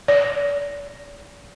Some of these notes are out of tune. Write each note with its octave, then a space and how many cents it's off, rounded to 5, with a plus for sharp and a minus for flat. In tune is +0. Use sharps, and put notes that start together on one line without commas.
D5 -35